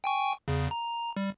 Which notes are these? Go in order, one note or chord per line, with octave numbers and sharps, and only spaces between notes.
G5 G#5 C#6
E2 C#3
A#5
G3